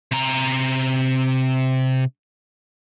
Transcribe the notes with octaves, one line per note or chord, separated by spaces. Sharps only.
C3 A#5